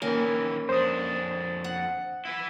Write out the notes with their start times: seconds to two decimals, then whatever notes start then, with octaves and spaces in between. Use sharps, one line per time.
0.02 D#3 E3 A#3 C#4
0.69 F2 D4 C5 D#6
1.64 F#5
2.25 E4 B4